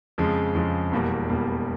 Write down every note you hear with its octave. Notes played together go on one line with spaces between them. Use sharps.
F2 C#3 F3 G#3
F2 C#3 F3 G#3
E1 E2 B2 G3 A#3
E1 E2 B2 G3 A#3